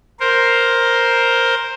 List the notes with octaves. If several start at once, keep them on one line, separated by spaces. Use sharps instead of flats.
A#4 C5